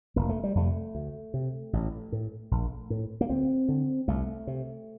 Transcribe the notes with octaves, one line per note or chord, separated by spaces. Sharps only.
F1 A#3
A3
G3
F2 C3 A3
D2
C3
A1
A2
A#1
A2
A#3
D2 C4
D3
C2 A3
C3